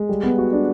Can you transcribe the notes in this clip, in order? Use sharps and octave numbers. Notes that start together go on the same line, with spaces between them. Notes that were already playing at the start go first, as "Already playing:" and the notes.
Already playing: G#3
G3
B3
F#4
D4